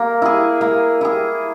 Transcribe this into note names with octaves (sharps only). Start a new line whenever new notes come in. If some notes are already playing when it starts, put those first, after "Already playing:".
Already playing: A#3
E4 G#4
A#3
E4 G#4